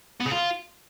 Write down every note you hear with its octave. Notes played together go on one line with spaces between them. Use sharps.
B3
C#3
F4